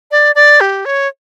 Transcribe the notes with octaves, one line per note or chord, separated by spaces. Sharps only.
D5
D5
G4
C#5